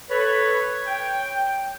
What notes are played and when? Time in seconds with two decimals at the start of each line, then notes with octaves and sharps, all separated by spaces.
0.11 A4 B4 C#5
0.87 G5